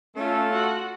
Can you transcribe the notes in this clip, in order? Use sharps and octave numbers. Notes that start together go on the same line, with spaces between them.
A3 C#4 F4 A4
F#4